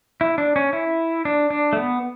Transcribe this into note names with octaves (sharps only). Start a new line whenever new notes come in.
E4
D4
C#4
E4
D4
D4
A3
B3